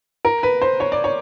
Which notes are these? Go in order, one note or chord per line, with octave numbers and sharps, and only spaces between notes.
A#4
B4
C5
C#5
D5
C#5